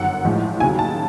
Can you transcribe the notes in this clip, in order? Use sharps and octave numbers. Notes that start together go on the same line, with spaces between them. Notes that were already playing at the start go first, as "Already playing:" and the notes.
Already playing: G1 F#2 D#3 F#5
A1 A2 F3 G#3
D#2 C#3 F#3 G#5
A5